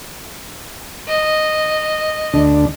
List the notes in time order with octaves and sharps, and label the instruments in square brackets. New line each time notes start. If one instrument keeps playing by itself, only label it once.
[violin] D#5
[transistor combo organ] D2 D3 D4